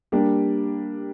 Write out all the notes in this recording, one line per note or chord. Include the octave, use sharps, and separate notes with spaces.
G3 A#3 D4 G4